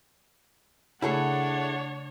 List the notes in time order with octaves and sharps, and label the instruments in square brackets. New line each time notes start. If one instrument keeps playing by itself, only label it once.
[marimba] C#3 A3 [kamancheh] D4 C#5 [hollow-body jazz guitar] E4 G#4 A4 [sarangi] F#5